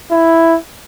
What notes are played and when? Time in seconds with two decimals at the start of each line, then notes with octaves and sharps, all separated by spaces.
0.11 E4